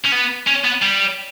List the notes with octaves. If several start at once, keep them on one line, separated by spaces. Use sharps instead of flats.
C#4
B3
C#4
B3
G3